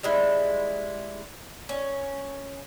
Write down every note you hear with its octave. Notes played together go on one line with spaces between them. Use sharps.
G3 G#3 E4
C#4